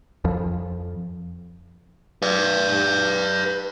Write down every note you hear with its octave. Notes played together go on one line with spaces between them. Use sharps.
F2 F3
B4 D5